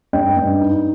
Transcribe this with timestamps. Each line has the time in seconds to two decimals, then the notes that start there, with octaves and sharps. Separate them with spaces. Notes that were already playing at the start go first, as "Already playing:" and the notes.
0.13 G2 D#5 G5
0.37 G2
0.61 D#4